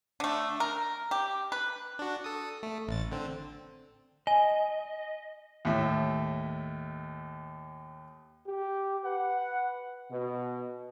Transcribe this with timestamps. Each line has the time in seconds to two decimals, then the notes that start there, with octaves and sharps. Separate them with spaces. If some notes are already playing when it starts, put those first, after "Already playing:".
0.20 D3 A3
0.60 A#4
1.11 G4
1.52 B4
1.99 D4 F#4
2.24 A4 D#6
2.63 A3
2.87 A1 A6
3.12 D3 C4
4.27 D#5 G#5
5.65 D#2 A2 E5
8.47 G4
9.04 B4 F#5
10.11 B2